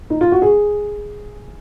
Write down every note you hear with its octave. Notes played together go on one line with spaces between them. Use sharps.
D#4
F4
F#4
G#4